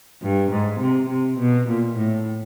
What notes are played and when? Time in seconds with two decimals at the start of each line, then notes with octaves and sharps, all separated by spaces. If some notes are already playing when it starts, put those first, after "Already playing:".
0.23 G2
0.51 G#2
0.80 C3
1.10 C3
1.39 B2
1.68 A#2
1.97 A2